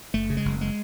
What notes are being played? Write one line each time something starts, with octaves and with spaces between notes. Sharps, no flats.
F#1 A3
C#3
G#3
F#1
G#3